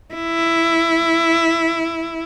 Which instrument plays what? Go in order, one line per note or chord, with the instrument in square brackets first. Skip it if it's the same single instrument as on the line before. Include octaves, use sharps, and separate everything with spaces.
[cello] E4